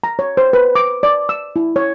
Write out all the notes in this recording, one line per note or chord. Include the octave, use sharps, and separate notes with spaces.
A#5
C#5
C5
B4
D6
D5
E6
E4
C#5